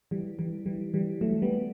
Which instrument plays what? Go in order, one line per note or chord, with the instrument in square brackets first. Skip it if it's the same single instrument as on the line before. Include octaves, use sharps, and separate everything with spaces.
[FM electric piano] E3 G3
E3 G3
E3 G3
E3 G3
F#3 A3
G3 B3